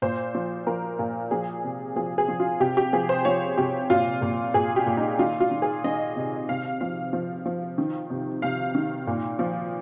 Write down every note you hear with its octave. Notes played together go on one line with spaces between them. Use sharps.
A#2 C5
F3
F3 A#4
A#2
F3 G#4
C3
F3 G#4
G#4
F3
F4
C3 G4
G4
F3 G#4
C5
F3 C#5
C3 G4
A#2 F4
A#2
A#2 G#4
G4
A#2
D#4
D#3 F4
F4
D#3
G#4
D#3 D#5
C3
C3 F5
F3 F5
F3
F3
D#3
C3
C3 F5
D#3
A#2
F3